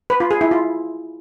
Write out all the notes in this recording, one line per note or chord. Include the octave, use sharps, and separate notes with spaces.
B4
F4
G#4
E4
F4